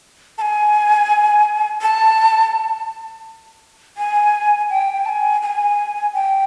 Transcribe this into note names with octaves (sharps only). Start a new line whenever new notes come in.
A5
G#5
A5
G#5
G5
A5
G#5
G#5
G5